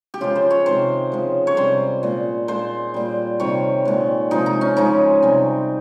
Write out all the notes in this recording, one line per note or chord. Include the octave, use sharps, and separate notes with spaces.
G4
C#3 F3 G#3 F4
C5
C#5
C3 D#3 G#3 C5
C#3 F3 G#3
C#5
C3 G3 C5
A#2 G#3
A#2 G#3 C5
A#2 G3
C3 D#3 G3 C#5
A#2 G#3
C3 F3 G#3 D#4
D#4
C#4
C#3 F3 G#3 D#4
C3 G3